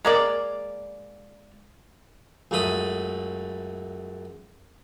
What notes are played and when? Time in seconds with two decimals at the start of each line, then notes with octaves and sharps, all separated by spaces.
0.05 G#3 A#3 D5
2.51 C#2 F#2 A3 B5 D#6